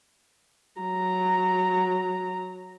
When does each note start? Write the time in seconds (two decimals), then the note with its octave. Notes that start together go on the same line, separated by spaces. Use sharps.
0.82 F#3 A#5